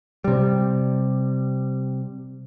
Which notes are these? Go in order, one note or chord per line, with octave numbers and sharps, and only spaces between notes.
C3 G3